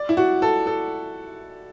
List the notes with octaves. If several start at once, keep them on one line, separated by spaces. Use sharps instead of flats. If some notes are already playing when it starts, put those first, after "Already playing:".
Already playing: D5
E4
F#4
A4
A4